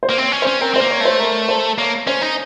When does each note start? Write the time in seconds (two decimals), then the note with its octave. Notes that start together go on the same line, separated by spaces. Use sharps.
0.03 C5
0.10 A#3
0.18 C4 C#5
0.32 C#4
0.42 C#4 C5
0.61 C4 A#4
0.74 C4 C5
0.81 A#3
0.91 C#5
1.01 A3 C5
1.19 A#4
1.49 C5
1.78 A#3 C#5
2.07 C#4 C5
2.21 D#4